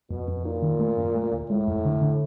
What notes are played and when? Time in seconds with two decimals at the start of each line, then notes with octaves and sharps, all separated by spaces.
0.10 F2 B2
0.28 F2
0.45 A#2 D#4
0.62 D#3
0.79 A3
0.97 F#2
1.15 A3
1.32 D2
1.50 A2 G#3
1.68 F2
1.85 D3
2.02 D3